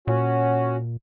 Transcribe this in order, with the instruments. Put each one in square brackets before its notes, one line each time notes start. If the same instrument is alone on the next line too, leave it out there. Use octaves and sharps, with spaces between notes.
[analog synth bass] A#2 [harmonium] C#4 F#4